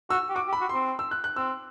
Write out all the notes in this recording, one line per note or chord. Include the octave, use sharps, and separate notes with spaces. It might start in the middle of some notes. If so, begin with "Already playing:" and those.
F#4 E6
G4
F#4 D6
G4
B5
F#4
C4 C6
E6
F#6
F#6
C4 E6